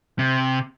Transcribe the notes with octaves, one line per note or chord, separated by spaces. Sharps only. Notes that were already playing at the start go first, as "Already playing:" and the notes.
C3